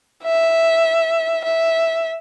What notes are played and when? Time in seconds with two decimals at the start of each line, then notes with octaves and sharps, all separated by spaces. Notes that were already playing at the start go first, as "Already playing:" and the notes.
0.24 E5
1.44 E5